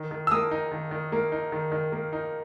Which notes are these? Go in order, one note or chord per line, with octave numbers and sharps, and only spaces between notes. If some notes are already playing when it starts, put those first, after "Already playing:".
Already playing: D#3
D#3
E6
A#3 D#6
D#4
D#3
D#3
A#3
D#4
D#3
D#3
A#3
D#4